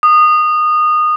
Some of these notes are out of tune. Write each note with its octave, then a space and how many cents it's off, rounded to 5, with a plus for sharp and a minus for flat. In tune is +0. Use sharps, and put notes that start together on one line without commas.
D#6 -20